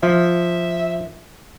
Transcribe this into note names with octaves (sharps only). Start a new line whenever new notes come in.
F3 E5